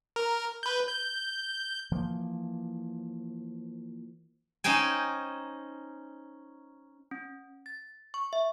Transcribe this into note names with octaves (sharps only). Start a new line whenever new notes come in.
A#4
B4 G6
G6
E3 F3 A#3
C#4 D#4 C5 G5 G#5
C#4
A6
C#6
E5